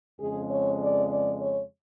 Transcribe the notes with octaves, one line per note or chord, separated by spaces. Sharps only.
F2 C#3 G#3 G#4
C#5
D5
D5
C#5